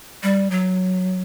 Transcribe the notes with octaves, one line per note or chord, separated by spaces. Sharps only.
G3
F#3